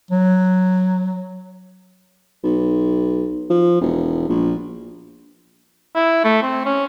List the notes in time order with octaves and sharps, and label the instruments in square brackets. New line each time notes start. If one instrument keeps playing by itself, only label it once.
[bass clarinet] F#3
[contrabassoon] B1
F3
E1
A#1
[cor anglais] E4
A3
C4
C#4